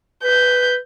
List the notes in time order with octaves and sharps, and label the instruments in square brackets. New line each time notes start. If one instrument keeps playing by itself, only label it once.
[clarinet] B4 [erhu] G6